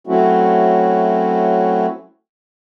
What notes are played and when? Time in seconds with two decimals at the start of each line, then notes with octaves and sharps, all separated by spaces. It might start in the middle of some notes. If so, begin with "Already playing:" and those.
0.07 F#3 A3 C4 C#4 E4 F#4